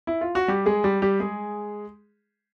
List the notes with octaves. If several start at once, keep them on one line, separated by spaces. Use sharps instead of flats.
E4
F4
F#4
G3 G4
G#3 G#4
G3 G4
G3 G4
G#3 G#4